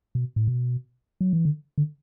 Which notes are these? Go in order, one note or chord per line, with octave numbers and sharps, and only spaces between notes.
B2
A2
B2
F#3
E3
D3
D3